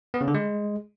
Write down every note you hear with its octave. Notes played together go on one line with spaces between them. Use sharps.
B3
C#3
D3
G#3